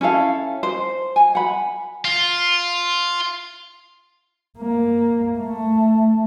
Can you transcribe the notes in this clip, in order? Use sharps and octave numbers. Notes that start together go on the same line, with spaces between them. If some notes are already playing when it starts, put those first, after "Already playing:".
C#4 E4 A4 F5
C5
G#5
F#5 B5
F4
A#3
A3